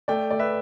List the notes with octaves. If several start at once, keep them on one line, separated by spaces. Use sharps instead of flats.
A3 D5 G5
A3 D5
B4 E5